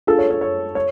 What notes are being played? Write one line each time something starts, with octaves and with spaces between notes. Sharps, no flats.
D4 F4 G#4 A4
C#5
C#5
C#5
C#5